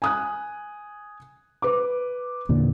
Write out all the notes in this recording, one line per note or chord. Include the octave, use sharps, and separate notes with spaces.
G#5 D#6 F#6
B4 D6
E2 A#2 D3